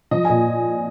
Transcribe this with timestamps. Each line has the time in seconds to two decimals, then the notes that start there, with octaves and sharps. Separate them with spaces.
0.11 F3 D#5
0.25 A#2 G#5